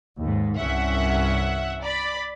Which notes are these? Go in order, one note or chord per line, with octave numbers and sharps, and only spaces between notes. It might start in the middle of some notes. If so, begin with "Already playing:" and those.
D#2 G#2
C2 G2 C#4 E5 F#5
D5 B5